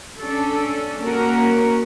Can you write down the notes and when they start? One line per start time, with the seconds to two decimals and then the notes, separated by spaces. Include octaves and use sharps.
0.19 C#4 D4 A4
1.02 A#3 C#4 F#4 A#4